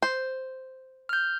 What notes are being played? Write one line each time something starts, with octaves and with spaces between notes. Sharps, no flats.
C5
F6 G6